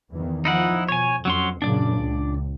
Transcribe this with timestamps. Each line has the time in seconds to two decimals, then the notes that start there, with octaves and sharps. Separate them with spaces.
0.12 E2 D#3 E3
0.45 F3 D#4 E4 F#5
0.89 B2 C#5 G#5
1.25 F2 F#3 C#4 C6
1.62 F#2 A#2 C#3 D4 D5
1.97 C#2